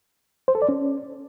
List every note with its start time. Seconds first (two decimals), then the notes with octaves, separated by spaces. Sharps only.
0.48 C5
0.55 A4
0.62 D5
0.69 C#4